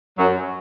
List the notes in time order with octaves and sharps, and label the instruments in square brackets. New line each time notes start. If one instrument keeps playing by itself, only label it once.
[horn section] F#2 F#3